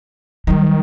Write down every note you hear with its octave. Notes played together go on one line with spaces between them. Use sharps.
D#3 F#3 G3